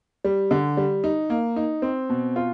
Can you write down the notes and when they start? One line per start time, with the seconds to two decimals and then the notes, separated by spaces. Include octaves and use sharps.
0.24 G3
0.51 D3
0.77 G3
1.04 D#4
1.30 A#3
1.56 D#4
1.82 C4
2.09 B2
2.36 F4